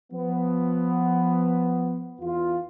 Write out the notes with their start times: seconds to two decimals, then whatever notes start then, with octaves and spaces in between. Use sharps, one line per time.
0.12 F3 B3
2.20 E2 E3 F4